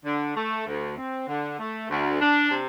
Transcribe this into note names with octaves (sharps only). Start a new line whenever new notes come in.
D3
A3
D2
C4
D3
A3
D2
D4
C3